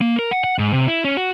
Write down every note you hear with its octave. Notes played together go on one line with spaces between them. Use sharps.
A#3
A#4
F#5
F#5
G#2
C3
E4
C#4
F#4